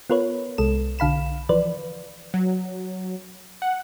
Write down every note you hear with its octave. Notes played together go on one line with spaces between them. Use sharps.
B3 F4 A#4 B4 C#5
C2 G#3 A4 E7
B1 D3 F5 B5 E7
E3 F3 B4 D5
F#3
F#5